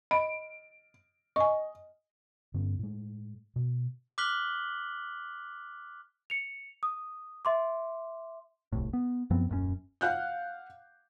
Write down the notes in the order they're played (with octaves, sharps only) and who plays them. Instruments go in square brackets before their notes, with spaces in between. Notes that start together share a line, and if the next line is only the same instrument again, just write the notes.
[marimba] D#5 B5 [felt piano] D7
[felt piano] D#5 [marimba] G#5 C#6
[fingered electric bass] G2 D3 B3 C#4
A2 G#3
B2
[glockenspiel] D6 F6 F#6 B6 F#7 G7
[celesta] C#7 F7
D#6
E5 C6 D6
[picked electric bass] D1 C2 A2
B3
F#2 F3 B3 C4
D#1 F#2 A2 C#4
[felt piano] F5 F#5 F#6 G6